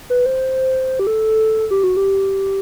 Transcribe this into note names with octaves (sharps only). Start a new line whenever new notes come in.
B4
C5
G4
A4
G4
F#4
G4